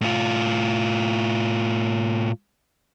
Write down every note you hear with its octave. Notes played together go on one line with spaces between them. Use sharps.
A2 F4